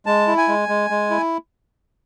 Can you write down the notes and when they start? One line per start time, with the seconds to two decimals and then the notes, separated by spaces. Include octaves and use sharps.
0.06 G#3 A5
0.27 E4
0.37 G#5
0.48 G#3
0.69 G#3
0.90 G#3
1.10 E4